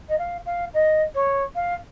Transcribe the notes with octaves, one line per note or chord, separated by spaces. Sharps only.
D#5
F5
F5
D#5
C#5
F5